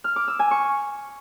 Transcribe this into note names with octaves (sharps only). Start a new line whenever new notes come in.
F6
D6
E6
G#5
C#6